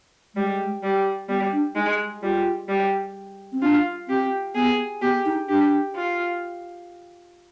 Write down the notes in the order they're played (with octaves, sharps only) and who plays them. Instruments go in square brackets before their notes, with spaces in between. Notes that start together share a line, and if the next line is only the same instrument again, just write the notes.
[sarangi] G3 [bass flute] G#3
[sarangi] G3
[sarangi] G3 [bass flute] B3
[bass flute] D4
[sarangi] G#3 [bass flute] D#4
[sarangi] G3 [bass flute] F4
[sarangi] G3
[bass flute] C4
[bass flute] D4 [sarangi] F4
[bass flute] C4 [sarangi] G4
[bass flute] B3 [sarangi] G#4
[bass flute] B3 [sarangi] G4
[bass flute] D#4
[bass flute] D4 [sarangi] G4
[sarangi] F4